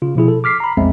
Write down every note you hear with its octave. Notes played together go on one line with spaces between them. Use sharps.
C#3 F4
B2 F3 E4 G#4
A4
D6 F6 B6 C7
A#5 B5
A#1 E2 G#3 C4 E5